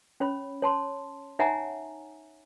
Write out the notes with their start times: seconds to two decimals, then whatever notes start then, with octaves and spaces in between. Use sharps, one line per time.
0.20 C#4 C#5 B5
0.62 C#5 A5 C6
1.39 D#4 C#5 E5 F#5 G#5 A#5